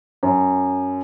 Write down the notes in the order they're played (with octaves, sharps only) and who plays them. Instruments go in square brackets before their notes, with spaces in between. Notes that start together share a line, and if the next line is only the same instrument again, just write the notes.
[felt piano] F#2